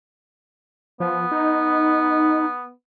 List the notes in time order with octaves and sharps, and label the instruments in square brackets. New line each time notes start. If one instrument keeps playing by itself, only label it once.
[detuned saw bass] F3 [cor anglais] B3
[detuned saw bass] D#4